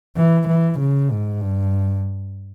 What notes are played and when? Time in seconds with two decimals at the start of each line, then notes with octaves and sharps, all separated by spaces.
0.17 E3
0.48 E3
0.79 C#3
1.10 G#2
1.41 G2